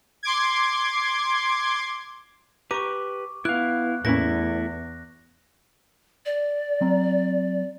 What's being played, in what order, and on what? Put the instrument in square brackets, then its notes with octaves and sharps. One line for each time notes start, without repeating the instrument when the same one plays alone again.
[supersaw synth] C6 D6 G#6
[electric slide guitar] G4 B4 [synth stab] A#5 [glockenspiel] C#6 D6
[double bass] B3 [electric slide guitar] E4 F5 [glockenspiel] F#6
[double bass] E2 [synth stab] A2 A#3 C#4 [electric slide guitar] A3 E4 B4 [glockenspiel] A#6
[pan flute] D5
[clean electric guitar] F#3 C4 A#5